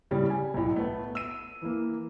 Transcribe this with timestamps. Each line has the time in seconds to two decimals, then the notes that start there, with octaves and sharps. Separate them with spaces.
0.11 A2 C#3 G3
0.30 G#5
0.54 B1 A2
0.76 A3 B3
1.15 E6 D#7
1.62 E3 A#3